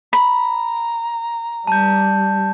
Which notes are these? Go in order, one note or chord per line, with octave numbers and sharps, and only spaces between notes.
A#5 B5
G3 A5 G6